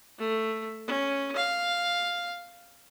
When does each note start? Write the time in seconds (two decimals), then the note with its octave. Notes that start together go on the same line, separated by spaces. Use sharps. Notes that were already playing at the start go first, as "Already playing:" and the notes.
0.19 A3
0.87 C#4
1.36 F5